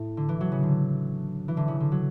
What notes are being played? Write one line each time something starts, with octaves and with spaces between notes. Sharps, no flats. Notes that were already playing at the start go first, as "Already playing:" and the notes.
Already playing: A2
D3
E3
F#3
C#3
D3
E3
D3
C#3
D3
F#3